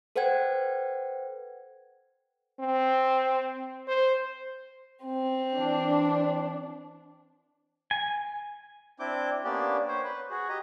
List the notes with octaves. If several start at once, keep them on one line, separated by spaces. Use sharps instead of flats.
A4 B4 C5 F#5 G5 G#6
C4
C5
C4
E3 D4
G#5
C4 D4 E4 D6 G6
A#3 B3 C#4 D4 G4 D5
C5 C#5
B4
F#4 G#4
G4 D#5 A#5